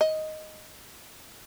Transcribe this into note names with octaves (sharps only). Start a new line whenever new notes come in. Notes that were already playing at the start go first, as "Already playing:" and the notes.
D#5